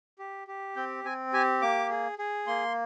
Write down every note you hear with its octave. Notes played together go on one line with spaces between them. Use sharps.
G4
G4
C4 G5
C4 G#5
G4 G#5
A#3 D6
G#4
G#4
A#3 C6